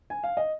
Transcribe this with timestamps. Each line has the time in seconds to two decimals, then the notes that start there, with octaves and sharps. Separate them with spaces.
0.10 G#5
0.24 F5
0.37 D#5